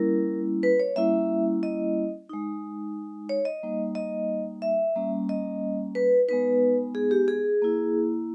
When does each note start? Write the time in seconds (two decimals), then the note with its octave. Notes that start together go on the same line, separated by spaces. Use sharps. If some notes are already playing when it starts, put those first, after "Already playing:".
Already playing: G3 A#3 C#4 E4 A#4
0.63 B4
0.80 C#5
0.96 G3 A#3 C#4 E4 E5
1.63 D#5
2.29 G#3 D#4
3.29 C#5
3.45 D#5
3.63 G3 A#3 D#4
3.95 D#5
4.62 E5
4.96 G3 A#3 C#4
5.29 D#5
5.95 B4
6.28 G#3 B3 D#4 B4
6.95 G#4
7.11 G4
7.28 G#4
7.62 A#3 E4